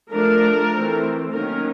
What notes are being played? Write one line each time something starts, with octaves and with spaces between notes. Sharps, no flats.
F3 A3 D4 A#4
E3 A3 C4
D#3 F#3 A#3 C#4 A#4